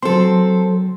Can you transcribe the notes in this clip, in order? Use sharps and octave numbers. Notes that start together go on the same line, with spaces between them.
F#3 C4 A4 C6